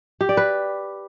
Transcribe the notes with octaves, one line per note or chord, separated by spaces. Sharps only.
G4
D5
B4